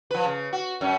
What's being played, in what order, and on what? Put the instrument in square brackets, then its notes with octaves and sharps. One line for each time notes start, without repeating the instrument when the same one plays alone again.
[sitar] F3 B4
C#3
F#4
F#2 C#4